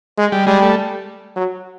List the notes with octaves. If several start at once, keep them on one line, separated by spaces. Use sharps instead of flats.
G#3
G3
G3 G#3
A3
F#3